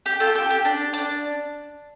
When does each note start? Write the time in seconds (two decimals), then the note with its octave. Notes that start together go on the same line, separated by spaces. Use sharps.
0.06 G4
0.20 F4 A4
0.35 G4
0.50 G4
0.65 D4
0.93 D4